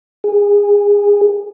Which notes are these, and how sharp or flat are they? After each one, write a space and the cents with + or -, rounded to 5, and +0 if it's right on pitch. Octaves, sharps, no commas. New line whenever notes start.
G#4 -25